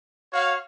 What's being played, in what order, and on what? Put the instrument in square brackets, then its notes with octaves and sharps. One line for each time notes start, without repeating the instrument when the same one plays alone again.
[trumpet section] F#4 C#5 F5